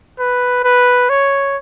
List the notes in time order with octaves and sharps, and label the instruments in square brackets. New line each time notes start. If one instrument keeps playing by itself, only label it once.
[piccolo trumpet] B4
B4
C#5